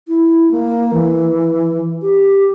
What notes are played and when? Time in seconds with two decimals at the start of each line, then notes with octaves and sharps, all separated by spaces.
0.08 E4
0.51 A#3
0.93 E3
2.02 G4